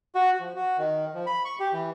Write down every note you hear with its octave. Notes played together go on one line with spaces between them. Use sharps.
F#4
F3
F#4
D#3
F3
B5
C#6
G4
E3